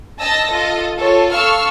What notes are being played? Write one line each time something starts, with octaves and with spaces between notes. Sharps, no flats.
D#5 A5 E6 A#6
F4 A4 D#5
F4 A4 C#5
A4 F5 C#6 E6 F6